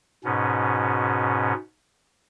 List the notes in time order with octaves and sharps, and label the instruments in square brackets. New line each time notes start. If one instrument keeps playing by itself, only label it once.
[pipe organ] G#2 B2 C#4